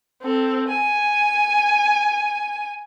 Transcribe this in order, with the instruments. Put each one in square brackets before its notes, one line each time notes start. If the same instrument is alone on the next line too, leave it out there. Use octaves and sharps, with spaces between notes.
[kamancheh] C4 A4
G#5